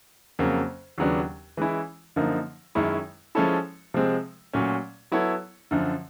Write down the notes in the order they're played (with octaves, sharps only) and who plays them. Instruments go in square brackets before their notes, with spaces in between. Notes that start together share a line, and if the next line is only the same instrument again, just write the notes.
[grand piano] F2 C#3 F#3 A#3
D#2 C#3 F#3 B3 D4
E3 G#3 C#4 E4
F#2 D3 F3 A#3 D#4
F#2 D#3 G#3 C#4 E4
F3 G#3 C#4 E4 A4
C3 F3 G#3 C4
A#2 F#3 A3 C#4
F#3 B3 E4 A4 C#5
F#2 D3 F3